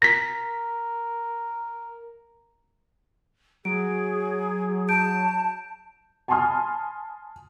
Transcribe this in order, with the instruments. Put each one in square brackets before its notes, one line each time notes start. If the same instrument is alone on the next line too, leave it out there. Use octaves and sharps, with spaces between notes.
[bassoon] A#4 [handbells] A#6 B6
[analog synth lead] F#3 [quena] G#4 [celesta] D7
[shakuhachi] A5 [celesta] G6 D7
[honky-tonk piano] G#5 A5 B5 C6 D#6 F6